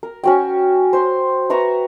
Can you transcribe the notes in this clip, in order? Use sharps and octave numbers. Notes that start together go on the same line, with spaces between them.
A#4
C#4 F#4 G5
C5 C6
B4 E5 A#5 C#6